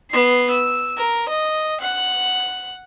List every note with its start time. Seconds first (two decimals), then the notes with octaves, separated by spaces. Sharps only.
0.11 B3 C7
0.51 E6
0.97 A#4
1.29 D#5
1.81 F#5 F#6